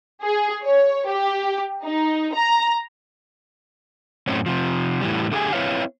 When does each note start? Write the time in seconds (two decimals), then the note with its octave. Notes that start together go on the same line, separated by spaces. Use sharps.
0.22 G#4
0.63 C#5
1.08 G4
1.84 D#4
2.35 A#5
4.27 F#2 A2 C4 C#4
4.46 C3 F3
5.01 A2 E3 G3
5.32 D3 A3 G4 G#4 F5 G#5
5.53 C4 E4 B4 C#5 E5 F5